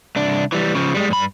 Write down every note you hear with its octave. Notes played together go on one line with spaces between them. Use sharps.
C2 D4
E3 G3
C#3 F3
G3 G#3
G2 B5